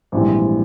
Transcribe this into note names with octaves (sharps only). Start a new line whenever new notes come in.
A#1 G#2 E3 G3 C4